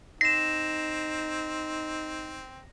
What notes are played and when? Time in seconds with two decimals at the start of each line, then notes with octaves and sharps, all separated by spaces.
0.21 C4 D#4 A#6 C7 E7